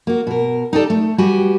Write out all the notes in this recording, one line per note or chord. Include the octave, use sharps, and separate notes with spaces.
A#3 F#4
B2 A#4
D#4 G4 A4 D5
A3
G3 F#4 G4 B4 G#5